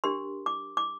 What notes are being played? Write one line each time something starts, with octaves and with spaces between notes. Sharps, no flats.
D4 G4 A#4 C6
D6
D6